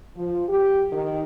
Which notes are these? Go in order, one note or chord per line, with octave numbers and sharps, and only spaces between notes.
F3
G4
D#3